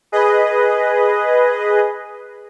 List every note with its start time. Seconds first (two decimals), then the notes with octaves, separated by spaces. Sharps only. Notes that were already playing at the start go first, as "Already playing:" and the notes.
0.12 G#4 B4 D#5